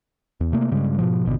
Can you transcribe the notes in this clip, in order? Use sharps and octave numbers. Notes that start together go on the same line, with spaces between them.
E2
C3 A3 A#3
G2 C#3 G#3
G#2 B2 F3
G#1 B2 D3